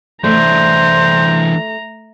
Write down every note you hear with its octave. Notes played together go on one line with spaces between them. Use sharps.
E3 A3 D4 C5 A#5